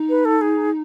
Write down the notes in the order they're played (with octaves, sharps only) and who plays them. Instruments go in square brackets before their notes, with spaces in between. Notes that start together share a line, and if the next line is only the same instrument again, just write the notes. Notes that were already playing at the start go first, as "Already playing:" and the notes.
Already playing: [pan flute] D#4
[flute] B4
A4
G#4